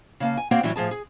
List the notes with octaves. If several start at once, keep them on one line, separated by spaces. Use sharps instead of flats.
C#3 A#3 A5
G#5
A#3 C4 F#4 C#5 F#5 G5
A2 E3 F#3 G3 E4
A2 F3 G#4 A5
G#4